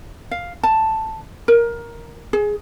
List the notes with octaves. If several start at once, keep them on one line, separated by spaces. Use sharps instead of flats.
F5
A5
A#4
G#4